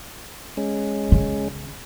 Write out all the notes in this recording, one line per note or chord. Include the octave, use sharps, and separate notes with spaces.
G#3 C#4
C#3